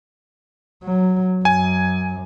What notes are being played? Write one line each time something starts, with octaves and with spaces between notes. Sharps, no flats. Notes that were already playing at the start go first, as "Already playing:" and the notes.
F#3
F#2 G#5